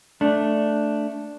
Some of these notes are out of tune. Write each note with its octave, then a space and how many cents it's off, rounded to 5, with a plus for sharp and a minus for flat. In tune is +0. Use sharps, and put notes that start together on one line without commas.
A3 +0 D4 +0